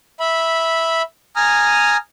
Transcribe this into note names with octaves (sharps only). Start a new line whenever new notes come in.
E5 B5
G#5 A#5 D#6 F6